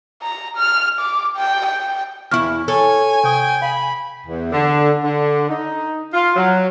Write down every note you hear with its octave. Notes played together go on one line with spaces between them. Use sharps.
A#5
F6
D6
G5
G5
E2 E4 C#6 F6
A4 C#5 G#5
C3 G5 D#6
F5 B5
E2
D3
D3
D#4
F4
F#3